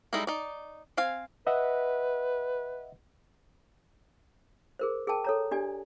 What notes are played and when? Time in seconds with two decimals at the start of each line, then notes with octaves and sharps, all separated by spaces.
0.13 G3 G#3 D#4 E4 A4
0.27 D#4 D5
0.97 C4 F5 G#5
1.47 B4 D#5 E5 F#5
4.79 G#4 A#4 C5
5.07 G#4 A#4 G5 A5
5.25 A4 C#5 A#5
5.51 D4 G4 D5 G#5